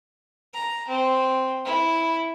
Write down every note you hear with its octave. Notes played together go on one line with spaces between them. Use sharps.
A#5
C4
E4